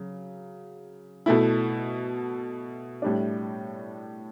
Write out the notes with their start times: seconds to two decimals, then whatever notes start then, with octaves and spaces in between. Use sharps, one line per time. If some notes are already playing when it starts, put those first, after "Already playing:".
Already playing: C#3 F#3
1.26 B2 A3 E4
3.02 A2 G3 D4